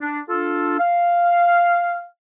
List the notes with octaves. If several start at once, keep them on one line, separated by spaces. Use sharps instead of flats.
D4
D4 F4 A4
F5